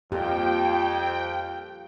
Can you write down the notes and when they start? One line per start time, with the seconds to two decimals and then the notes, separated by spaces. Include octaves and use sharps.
0.12 F2 A#2 G4 G5